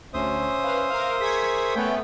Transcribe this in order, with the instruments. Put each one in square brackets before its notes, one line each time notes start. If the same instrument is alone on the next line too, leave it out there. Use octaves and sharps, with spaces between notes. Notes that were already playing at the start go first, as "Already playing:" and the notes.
[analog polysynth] D2 [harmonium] C#4 [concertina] C5 E5 D#6
[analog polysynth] B4 F5
A#4 F5
[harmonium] G#4 A#4 [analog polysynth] C#6 G#6 B6
[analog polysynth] A3 B3 [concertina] C#4 G5